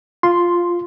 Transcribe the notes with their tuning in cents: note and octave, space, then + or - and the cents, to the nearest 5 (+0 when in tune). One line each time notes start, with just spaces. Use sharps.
F4 +0 C6 +0